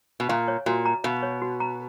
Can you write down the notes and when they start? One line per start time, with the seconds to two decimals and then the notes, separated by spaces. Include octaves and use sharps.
0.20 B2
0.29 A#2 F5
0.48 C#5
0.66 A#2 F#4
0.86 A#5
1.04 B2 F5
1.23 C#5
1.42 F#4
1.60 A#5